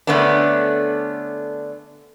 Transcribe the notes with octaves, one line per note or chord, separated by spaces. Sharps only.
D3 A3 B3 C#4 D4